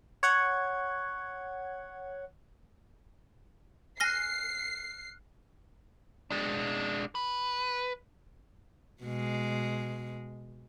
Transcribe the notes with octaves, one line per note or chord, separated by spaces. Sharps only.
C#5 F#5 G#6
G#5 F6 F#6 A#6 C7 G7
G#3 D4
B4
B2 G#3